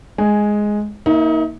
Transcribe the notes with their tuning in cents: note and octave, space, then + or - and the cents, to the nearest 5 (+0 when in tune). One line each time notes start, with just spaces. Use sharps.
G#3 +5 G#5 +0
A#3 +0 D#4 +35 E5 +0